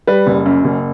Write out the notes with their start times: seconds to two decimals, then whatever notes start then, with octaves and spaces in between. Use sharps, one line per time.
0.07 G3 B4
0.27 F#1
0.46 F#2
0.64 F#1